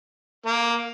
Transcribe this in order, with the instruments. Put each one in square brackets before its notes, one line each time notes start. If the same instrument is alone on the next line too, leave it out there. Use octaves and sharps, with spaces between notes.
[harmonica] A#3